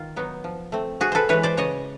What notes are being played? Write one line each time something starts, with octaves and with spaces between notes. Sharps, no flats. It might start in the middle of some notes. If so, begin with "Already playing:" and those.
Already playing: D#3 F4
F#3 B3 D#4
F3
A3 C4
C3 F#4 G#4
A4 B4 C5
E3 G#3 B4 C#5
C5 D5
C#3 C#5 D#5